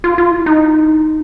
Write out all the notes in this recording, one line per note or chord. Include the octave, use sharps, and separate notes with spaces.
F4
F4
E4
D#4